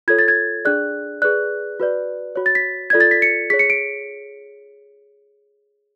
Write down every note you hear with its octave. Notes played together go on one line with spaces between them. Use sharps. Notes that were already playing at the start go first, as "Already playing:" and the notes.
F4 A4 C#5 G#6
A6
G#6
D4 G#4 D5 F#6
G#4 B4 D5 F#6
F#4 B4 D5
F#4 C#5
A6
B6
F4 A4 D5 G#6
A6
B6
C#7
G#4 C#5 B6
C#7
D7